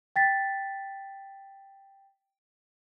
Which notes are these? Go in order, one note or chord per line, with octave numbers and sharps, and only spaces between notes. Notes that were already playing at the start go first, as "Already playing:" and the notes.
G5 A6 B6